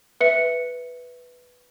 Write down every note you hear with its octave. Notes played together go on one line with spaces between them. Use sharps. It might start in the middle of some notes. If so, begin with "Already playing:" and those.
B4 E5 C#7